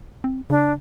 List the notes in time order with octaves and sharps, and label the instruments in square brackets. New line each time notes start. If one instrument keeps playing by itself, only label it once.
[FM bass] C4
[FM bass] C#3 [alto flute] D4